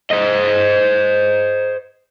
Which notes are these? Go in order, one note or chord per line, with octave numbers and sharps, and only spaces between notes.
C5 D#5